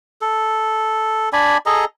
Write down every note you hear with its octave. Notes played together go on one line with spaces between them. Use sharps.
A4
D4 D5 G#5 B5
G#4 A4 D#5 A#5